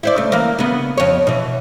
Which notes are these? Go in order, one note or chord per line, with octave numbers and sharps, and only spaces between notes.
E4 C5 D5
C#3 A3
E3 A#3
C#3 B3
F2 C#5
B2 E3